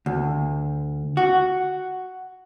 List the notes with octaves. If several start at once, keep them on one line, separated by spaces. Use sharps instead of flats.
D2
F#4